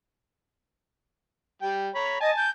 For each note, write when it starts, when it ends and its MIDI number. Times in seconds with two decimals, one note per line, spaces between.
1.62 1.89 55
1.62 1.89 79
1.95 2.16 73
1.95 2.18 82
1.95 2.16 83
2.20 2.30 75
2.20 2.46 80
2.20 2.46 81
2.36 2.49 91